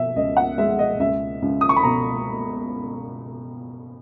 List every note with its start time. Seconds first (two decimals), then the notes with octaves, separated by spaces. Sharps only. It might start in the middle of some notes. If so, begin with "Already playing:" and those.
Already playing: B2 E5
0.16 C#2 D#5
0.37 F#5
0.58 G#3 E5
0.79 D#5
0.99 C#2 E5
1.42 C#2
1.61 D#6
1.69 C#6
1.76 B5
1.83 B2 A#5